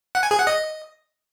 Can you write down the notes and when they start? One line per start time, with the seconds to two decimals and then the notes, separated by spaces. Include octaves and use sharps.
0.15 F#5
0.23 G#5
0.31 G#4
0.39 F#5
0.47 D#5